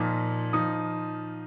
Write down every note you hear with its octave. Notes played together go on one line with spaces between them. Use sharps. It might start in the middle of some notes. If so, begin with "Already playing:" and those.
Already playing: A#2 F3 D#4
F3 D#4 D#6